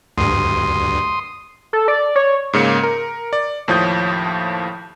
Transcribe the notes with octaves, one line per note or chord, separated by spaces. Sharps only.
D2 G2 C6 D#6
A4
D5
C#5
G#2 C#3 A#3 C#7
A#4
D5
D#2 A2 F3 C#5 D#6 G6